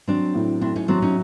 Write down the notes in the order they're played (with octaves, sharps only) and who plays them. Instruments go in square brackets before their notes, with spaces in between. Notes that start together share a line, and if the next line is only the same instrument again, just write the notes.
[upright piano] F#3 [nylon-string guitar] C4 D4
[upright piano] A2
[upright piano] A2 [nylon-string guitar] C4 D4
[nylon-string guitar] C#4 D#4
[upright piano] F#3 [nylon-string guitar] C4 D4
[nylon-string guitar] C#4 D#4